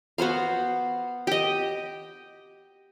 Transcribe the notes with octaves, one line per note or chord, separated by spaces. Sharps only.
B3 F#4 C5 F5
G4 D#5